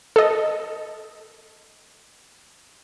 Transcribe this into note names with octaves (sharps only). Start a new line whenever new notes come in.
A4 D#5